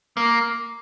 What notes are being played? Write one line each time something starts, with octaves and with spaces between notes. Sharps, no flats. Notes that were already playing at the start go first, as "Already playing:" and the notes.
A#3